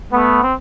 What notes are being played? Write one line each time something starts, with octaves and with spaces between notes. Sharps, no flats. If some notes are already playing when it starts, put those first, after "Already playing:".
A3 B3
C4